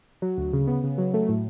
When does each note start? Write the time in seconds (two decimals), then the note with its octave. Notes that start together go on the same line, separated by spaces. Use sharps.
0.22 F#3
0.38 D2
0.53 C#3
0.67 B3
0.83 C#3
0.98 F#3
1.14 A3
1.29 A2